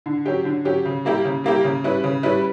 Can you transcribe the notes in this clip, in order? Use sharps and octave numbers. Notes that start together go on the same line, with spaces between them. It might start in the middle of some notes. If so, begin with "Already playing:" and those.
D3
F#3 C#4 G4
D3
F#3 C#4 G4
C#3
G3 A#3 E4 G4
C#3
G3 A#3 E4 G4
C#3
G3 C#4 E4 B4
C#3
G3 C#4 E4 B4